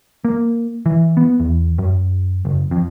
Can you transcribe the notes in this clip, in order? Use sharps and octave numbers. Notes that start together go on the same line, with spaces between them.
A#3
E3
B3
E2
F#2
F#1
F2